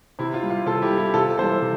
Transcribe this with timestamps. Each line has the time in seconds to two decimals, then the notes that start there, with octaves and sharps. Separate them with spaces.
0.19 C3 E4
0.34 F4
0.43 G3
0.50 F4
0.66 C3 F4 A4
0.82 E4 G4
0.90 G3
0.98 E4 G4
1.14 C3 F4 A4
1.38 E3 G3 A4 C5
1.62 C3